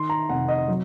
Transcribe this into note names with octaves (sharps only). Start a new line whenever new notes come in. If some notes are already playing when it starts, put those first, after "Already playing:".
Already playing: D#3 C6
A#5
F1 F#5
D#5
F#3